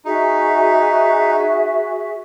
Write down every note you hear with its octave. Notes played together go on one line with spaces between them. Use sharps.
D#4 F#4 G#4 E5